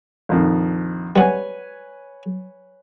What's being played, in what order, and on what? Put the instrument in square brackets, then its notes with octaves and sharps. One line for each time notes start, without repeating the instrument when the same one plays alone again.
[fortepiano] A#1 F2 D#3
[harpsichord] G3 B3 [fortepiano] B4 C#5 G#5